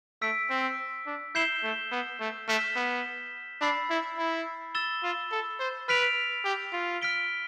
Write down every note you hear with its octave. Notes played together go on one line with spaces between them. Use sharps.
A3 E6 B6 D7
C4
D4
E4 G6 C7 E7 G7
A3
B3
A3
A3 F6 B6 E7 G7
B3
D4 B5 E6 A6 C7
E4
E4
E6 A6 E7 G7
F4
A4
C5
B4 F6 B6 D7 F7
G4
F4
F6 B6 D7 G7